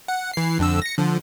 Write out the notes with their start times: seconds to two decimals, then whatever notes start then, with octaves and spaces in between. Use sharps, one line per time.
0.08 F#5
0.34 E3 C7
0.59 F2 D3 E6
0.82 A#6 C#7
0.98 D3 F3